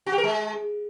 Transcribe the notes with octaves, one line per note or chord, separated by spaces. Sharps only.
F#4
G4
A#4
G#3